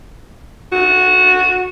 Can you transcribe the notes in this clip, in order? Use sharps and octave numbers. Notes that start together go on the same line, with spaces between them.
F#4